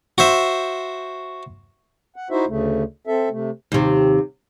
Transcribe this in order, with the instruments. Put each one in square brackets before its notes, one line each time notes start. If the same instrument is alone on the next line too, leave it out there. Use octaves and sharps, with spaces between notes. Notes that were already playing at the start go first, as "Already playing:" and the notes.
[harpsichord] F#4 C5 E5
[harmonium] F#5
D#4 E4 F#4 C5 E5
D2 C#3 A3
C4 A4 E5
C3 A3
[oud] D#2 C3